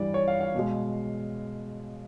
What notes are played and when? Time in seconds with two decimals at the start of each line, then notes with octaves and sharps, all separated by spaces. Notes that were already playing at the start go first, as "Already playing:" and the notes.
Already playing: G2 E3 G3 D5
0.14 C#5
0.28 F5
0.41 F5
0.55 B2 G#3